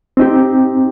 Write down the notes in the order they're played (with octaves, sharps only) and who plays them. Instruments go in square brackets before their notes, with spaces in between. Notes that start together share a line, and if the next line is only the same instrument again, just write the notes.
[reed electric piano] C4 D#4 G4